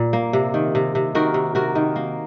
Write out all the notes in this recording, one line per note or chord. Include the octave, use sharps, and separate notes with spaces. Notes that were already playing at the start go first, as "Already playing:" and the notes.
Already playing: A#2
A#3
C3
D#3
C3
C3
D#3 F#4 A#4
C3
C3 F#4 A#4
D#3
A#3